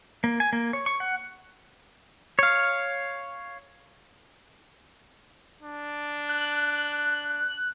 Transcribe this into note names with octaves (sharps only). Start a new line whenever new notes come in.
A#3
G#5
A#3
C#5
C#6
F#5
C#5 F5
D4
F#6